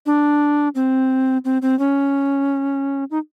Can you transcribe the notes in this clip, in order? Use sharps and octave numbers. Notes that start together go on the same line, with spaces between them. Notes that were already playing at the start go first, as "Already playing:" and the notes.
D4
C4
C4
C4
C#4
D#4